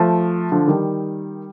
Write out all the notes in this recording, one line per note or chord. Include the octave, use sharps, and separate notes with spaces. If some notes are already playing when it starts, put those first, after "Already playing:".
Already playing: F3 A3
D3 F3
D#3 G3